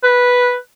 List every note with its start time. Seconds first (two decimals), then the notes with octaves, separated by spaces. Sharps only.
0.03 B4